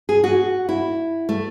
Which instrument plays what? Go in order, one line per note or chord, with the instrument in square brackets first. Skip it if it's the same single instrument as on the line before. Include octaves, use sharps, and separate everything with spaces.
[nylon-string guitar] G#4
F#4
E4
A3